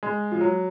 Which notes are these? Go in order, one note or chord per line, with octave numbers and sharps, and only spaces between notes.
G#3
F3
F#3